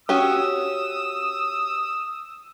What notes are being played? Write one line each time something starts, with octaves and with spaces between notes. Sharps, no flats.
C#4 F#4 G4 D#6 E6